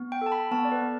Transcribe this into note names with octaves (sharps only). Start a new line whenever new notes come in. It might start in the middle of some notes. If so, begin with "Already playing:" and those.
Already playing: B3
G5
A4 A5
B5
B3 A5
D5
B4
B3